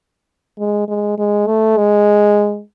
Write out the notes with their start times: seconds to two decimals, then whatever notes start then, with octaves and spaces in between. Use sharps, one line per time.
0.59 G#3
0.88 G#3
1.18 G#3
1.47 A3
1.77 G#3